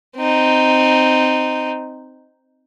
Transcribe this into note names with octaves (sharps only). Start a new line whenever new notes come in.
C4 D#4